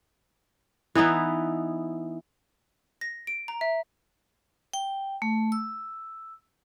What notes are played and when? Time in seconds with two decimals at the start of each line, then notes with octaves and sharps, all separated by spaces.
0.95 E3 B3 D#4 E4
3.01 A#6
3.27 D7
3.48 A#5
3.61 E5
4.74 G5
5.22 A3
5.52 E6